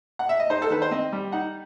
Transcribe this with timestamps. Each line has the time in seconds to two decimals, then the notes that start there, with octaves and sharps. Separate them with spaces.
0.19 F#5
0.29 E5
0.40 D#5
0.50 D#4 C5
0.62 A4
0.70 D#3 B4
0.82 C5
0.91 C4 D#5
1.12 G3
1.32 D#4 F#5